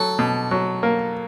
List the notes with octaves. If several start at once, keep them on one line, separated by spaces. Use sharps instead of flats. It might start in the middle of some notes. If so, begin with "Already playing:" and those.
Already playing: F#3 A4
B2
F#3
A#3